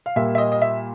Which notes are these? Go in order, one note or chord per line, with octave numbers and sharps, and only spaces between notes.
F5
A#2 G3 A#3 E5
E5
D#5
D#5
E5